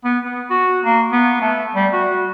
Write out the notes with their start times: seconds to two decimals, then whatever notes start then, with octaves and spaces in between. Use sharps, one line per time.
0.04 B3
0.26 B3
0.50 F#4
0.85 A#3
1.12 B3
1.41 A3
1.75 G3
1.93 F#4